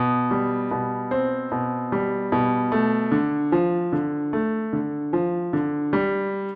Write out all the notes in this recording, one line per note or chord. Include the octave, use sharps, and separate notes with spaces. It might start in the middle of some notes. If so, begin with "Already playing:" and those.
Already playing: B2
G3
B2
C4
B2
G3
B2
A3
D3
F3
D3
A3
D3
F3
D3
G3